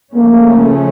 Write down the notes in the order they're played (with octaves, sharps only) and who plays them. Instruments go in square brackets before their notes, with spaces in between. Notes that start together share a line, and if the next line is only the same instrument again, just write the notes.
[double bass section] C#3 F3 A3 C#4 [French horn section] A#3